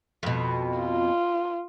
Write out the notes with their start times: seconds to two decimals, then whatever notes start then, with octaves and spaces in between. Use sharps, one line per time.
0.23 F2 B2
0.79 F4